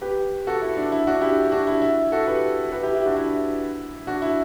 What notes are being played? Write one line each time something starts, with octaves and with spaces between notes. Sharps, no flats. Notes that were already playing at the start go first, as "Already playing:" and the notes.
G4 B4
F#4 A4
E4
D4
E4
D4 F#4
E4 G4
G4
D4 F#4
E4
E4
F#4 A4
G4 B4
G4 B4
E4 G4
E4 G4
D4 F#4
E4
D4 F#4
E4